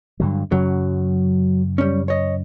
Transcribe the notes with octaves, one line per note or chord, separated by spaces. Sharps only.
G2 D3 F#3
F#2 C#3 F#3
G3 C#4
C#5 D#5